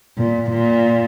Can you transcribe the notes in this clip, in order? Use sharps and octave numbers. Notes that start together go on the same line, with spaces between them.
A#2
A#2